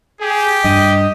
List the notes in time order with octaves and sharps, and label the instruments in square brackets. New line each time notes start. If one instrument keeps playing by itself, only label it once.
[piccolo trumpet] G4 [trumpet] G#4
[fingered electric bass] G2 [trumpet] D#5